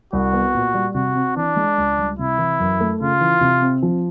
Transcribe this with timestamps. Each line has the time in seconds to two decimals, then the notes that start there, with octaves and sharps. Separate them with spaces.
0.13 C2 F#4
0.33 B3
0.54 A#2
0.74 G3
0.95 C3 F#4
1.15 C4
1.36 E3 D4
1.56 G#3
1.78 C#2
1.99 G3
2.19 C3 E4
2.38 E3
2.60 F#2
2.81 A3
3.01 C#3 F4
3.21 E3
3.41 C3
3.62 C4
3.83 F3